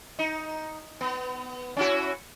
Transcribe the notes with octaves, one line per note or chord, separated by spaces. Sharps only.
D#4
B3
C#4 E4 F#4